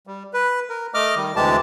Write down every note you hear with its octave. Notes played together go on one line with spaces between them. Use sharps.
G3
B4
A#4
A3 D#5 D6 F6
D#3 G3
D2 C3 E3 G#3 G4 A5